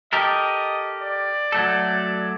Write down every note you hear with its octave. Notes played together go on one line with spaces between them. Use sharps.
G4 A4 A#4 D#5
D5
F#3 A3 A4